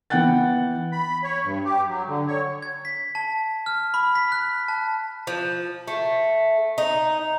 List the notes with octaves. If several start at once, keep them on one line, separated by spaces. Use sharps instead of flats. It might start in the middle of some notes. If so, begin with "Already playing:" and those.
E3 B3 F#5 G5 F#6 A6
B5
C#5
G2
G4
F#3
D3
C#5
G#6
B6
A5
F6
B5
B6
F#6
A5
F3
A3
D#4